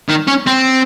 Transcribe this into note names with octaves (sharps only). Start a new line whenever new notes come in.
D#3
C#4
C4